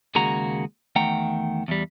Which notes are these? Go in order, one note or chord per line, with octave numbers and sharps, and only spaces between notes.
D#2 C#3 G#3 A#3 F#4 A#5
E2 D#3 A3 F#5 G5 A#5
E2 G3